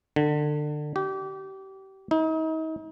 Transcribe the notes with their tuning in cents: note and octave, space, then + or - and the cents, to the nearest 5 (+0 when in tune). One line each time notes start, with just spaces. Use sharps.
D3 +25
G4 -30
D#4 +40